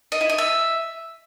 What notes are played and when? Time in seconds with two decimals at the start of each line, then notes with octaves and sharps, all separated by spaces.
0.12 D#5
0.21 E4
0.30 D#5
0.38 E5